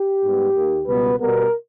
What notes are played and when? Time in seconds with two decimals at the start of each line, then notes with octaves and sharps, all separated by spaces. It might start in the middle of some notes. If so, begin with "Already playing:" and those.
Already playing: G4
0.22 G#2 G3 B3
0.55 D#2 D#3 A#3
0.86 C#2 B2 G3 B3 B4
1.19 B2 G3 B3 A#4